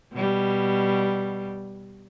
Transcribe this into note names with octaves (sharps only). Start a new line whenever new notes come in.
B2 G3